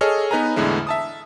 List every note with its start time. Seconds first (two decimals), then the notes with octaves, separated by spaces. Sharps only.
0.01 G#4 A4 C#5 D#5 F6
0.31 B3 D#4 B4 G#5 A#5
0.56 E2 A2 D3 G#3 E4
0.87 E5 A5 D#6